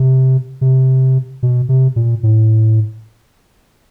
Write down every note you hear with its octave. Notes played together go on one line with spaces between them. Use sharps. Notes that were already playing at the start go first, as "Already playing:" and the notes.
Already playing: C3
C3
B2
C3
A#2
A2